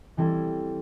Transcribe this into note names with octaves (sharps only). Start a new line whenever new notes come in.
E3 G3 C4 E4 A4